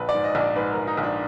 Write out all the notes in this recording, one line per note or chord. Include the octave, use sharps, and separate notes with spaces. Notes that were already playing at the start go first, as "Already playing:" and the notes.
Already playing: A#1 B4
D5
G#2
D#5
A#1
D5
G#2 B4
A#4
A#1
D#4
A#1
D4